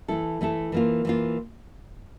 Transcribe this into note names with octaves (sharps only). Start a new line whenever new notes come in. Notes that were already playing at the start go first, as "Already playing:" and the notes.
E3 A3 E4 A4
E3 A3 E4 A4
E3 A#3 F4
E3 A#3 F4